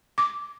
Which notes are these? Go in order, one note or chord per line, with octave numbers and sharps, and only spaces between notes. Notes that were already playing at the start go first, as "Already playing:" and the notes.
D6